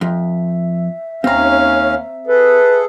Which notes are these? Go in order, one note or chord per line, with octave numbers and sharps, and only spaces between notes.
F2 E5
D#2 C4 C#4 F5 A#5
G#4 A4 B4